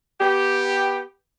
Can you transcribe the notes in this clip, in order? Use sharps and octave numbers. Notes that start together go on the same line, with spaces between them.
B3 G4